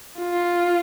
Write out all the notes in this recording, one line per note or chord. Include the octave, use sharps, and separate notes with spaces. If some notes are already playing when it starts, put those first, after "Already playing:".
F4